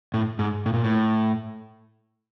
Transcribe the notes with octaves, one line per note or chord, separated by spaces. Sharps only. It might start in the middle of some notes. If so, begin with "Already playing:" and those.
A2
G#2
A2
A#2
A2